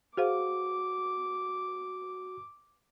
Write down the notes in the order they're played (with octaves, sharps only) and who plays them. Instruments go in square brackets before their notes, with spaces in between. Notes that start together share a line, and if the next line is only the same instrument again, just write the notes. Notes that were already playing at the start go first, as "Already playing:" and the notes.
[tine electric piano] F#4 [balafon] G#4 C5 F5 [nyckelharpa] D6